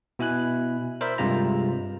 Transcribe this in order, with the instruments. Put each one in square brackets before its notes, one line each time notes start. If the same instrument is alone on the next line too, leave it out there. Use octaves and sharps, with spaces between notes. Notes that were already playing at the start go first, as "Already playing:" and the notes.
[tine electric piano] B2 E4 G#5 F#6
A#4 C5 D5 E5 B5
G2 C3 G#3 F4 A#5